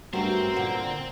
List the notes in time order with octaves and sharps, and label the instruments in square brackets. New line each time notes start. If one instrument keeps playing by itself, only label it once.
[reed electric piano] G2 [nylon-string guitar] A3 C#4 F#4 [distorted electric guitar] C4 C5 [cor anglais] A#4
[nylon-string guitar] A#2 D3 F#5